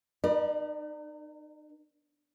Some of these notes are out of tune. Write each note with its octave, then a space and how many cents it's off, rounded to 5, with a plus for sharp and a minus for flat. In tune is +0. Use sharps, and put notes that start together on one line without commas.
D#4 -35 B4 -40 D5 +25